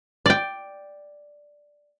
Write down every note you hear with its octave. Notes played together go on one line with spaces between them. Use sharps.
D5 G5